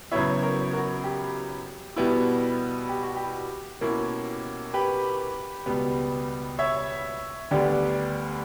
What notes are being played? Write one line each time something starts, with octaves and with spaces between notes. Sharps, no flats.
F#2 C#3 F#3 B3 E4 C#5 E5
A#4 C#5
F#4 A#4
G4
B2 G3 B3 E4
G4
F#4
G4
B2 A#3 C#4 E4
G4 B4
C#2 B2 G3 B3
C#5 E5
D2 D3 G3 B3 D4 G4